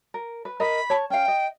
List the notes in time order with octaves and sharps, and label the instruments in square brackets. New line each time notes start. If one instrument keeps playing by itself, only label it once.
[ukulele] A#4
B4
[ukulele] A#4 D#5 [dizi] B5
[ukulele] C#5 A5
[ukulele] C#4 F5 [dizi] G5
[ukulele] D#5